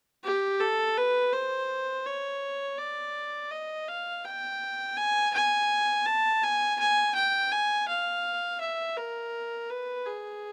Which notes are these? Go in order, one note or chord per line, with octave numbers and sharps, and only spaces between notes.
G4
A4
B4
C5
C#5
D5
D#5
F5
G5
G#5
G#5
A5
G#5
G#5
G5
G#5
F5
E5
A#4
B4
G#4